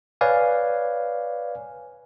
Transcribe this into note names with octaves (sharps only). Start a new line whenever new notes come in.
B4 C#5 D5 F5 G#5